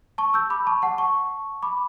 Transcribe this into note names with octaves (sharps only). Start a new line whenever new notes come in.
A5 C#6
E6 G6
B5 D6
A5 C#6
F#5 A5
A5 C#6
B5 D6